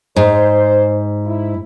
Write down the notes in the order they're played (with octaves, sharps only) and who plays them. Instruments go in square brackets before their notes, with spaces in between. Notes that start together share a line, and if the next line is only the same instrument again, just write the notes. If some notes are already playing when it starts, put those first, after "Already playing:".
[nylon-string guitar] G#2 [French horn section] C5
[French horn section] E4